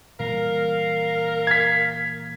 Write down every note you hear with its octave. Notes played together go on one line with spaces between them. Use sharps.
A#2 E3 G3 A#4 F5
G#6 B6